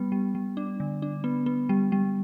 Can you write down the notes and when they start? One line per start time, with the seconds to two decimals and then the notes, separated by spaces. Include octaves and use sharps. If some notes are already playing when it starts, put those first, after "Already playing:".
Already playing: G3 B3
0.12 G3
0.35 G3
0.57 D4
0.80 D3
1.02 D4
1.24 B3
1.46 B3
1.69 G3
1.92 G3